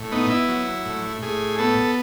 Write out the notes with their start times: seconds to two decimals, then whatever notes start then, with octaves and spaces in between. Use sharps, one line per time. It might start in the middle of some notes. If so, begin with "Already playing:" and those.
Already playing: A2
0.11 B3 D#4
0.30 E4
0.49 F#3
0.85 A2
1.22 A2 G#4
1.58 B3 A4